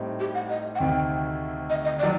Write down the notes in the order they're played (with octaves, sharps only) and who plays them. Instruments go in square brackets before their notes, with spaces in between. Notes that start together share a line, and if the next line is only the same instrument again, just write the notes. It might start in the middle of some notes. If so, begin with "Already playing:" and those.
Already playing: [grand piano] A2 G3 C4 D#4
[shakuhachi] G4
F#5
D#5
F#5
[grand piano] D2 C3 D#3 [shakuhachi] G5
[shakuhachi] D#5
D#5
[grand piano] D#3 F#3 [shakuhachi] D5